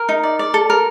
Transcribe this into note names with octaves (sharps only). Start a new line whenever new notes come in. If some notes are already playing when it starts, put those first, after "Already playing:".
Already playing: A#4 A#5
D#4
D5
D5
A4
A#4